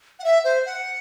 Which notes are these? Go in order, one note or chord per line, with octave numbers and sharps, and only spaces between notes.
F#5
E5
C5
F#5